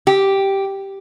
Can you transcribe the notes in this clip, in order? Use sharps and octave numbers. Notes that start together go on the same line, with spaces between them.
G4